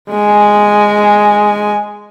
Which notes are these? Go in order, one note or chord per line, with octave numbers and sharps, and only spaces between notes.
G#3 G#5